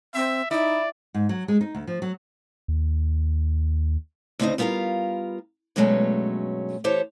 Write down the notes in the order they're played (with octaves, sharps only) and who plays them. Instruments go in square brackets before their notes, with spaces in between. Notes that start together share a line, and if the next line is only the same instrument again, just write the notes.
[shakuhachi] C4 [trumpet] E5
[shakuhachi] D#4 [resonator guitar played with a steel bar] E4 [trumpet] D5
[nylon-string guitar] G#2
F#3
G#3
D#4
D2
F3
F#3
[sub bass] D#2
[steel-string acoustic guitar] D2 A2 C#3 C4 D#4 D#5
G3 B3 F4 A4 A#4 F5
G2 B2 F#3 G#3 A3 C#4
E3 G4 A4 C5 C#5